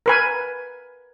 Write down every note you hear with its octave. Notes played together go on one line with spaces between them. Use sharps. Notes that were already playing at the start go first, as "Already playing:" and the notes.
A#4 B4 G#5